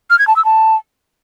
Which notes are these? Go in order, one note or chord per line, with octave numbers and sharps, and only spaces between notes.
F6
G#6
A5
E6
A5